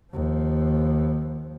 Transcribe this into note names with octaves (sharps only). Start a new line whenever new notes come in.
D#2 F3